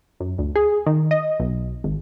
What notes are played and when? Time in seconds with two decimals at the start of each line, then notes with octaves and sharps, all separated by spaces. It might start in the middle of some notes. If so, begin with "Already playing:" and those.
0.20 F#2
0.38 D2
0.56 G#4
0.86 D#3
1.11 D#5
1.39 B1
1.84 G#1